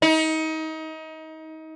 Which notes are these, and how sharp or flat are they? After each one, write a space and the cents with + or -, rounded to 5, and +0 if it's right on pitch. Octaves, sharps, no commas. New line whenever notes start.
D#4 +30